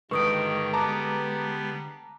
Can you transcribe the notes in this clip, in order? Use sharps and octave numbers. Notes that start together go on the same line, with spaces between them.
G2 D3 D#3 G#3 B4 C#6 D#6 D7
G3 B3 A5 A#5 D6